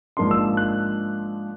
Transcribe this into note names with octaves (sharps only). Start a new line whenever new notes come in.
G#2 F3 A#3 D4 C6
E6
F#6